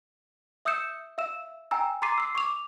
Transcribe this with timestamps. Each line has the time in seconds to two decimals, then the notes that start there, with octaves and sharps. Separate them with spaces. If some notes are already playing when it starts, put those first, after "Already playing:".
0.65 E5 D#6 E6 G6 C#7 E7
1.18 E5 F5 E6 E7
1.71 G5 G#5 A#5 E6
2.02 A#5 C6 D6 A6 C7 D#7
2.18 E6 C7
2.35 C#6 D6 F7